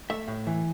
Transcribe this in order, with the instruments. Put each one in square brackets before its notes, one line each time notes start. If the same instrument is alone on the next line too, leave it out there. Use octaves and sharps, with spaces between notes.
[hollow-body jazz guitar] A3 E5
A2
E3